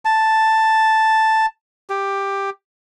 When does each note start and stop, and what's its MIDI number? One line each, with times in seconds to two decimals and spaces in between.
0.05 1.46 81
1.90 2.50 67